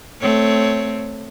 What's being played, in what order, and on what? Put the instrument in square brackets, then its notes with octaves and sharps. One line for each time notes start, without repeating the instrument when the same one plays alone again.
[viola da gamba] A3 C4 C#5